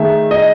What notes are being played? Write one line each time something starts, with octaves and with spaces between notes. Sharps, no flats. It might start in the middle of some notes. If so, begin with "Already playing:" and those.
Already playing: D#3 A3 D#4 G#4 E5
D#5